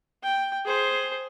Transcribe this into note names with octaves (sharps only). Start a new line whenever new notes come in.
G5
G#4 C5